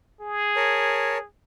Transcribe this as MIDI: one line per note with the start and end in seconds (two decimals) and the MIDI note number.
0.21 1.25 68
0.56 1.18 70
0.56 1.18 73
0.56 1.18 81